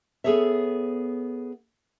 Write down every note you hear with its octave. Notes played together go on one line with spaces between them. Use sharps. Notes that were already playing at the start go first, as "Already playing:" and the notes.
B3 G#4 A4 C#5 E5